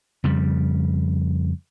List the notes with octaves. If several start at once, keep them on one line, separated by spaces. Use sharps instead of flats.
F2 C#3 G3